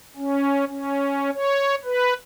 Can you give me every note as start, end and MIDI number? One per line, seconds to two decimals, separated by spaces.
0.17 0.65 61
0.68 1.30 61
1.33 1.75 73
1.85 2.14 71